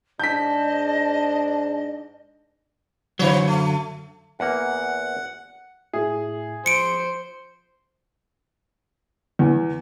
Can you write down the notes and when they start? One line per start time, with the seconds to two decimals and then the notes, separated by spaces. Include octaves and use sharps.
0.20 G#2 D4 D#5 A5 G6 B6
3.19 F#2 D3 D#3 F#3 C#5
3.48 A3
4.40 E2 A#3 F#5
5.93 A2 G#4 E5
6.66 F3 C5 C#7 D7
9.39 E2